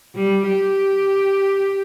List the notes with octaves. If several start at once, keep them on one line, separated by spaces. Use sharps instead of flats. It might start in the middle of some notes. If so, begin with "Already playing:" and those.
G3
G4